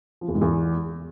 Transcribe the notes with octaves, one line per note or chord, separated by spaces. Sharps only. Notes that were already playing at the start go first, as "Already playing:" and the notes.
F3
E2
G#2
E2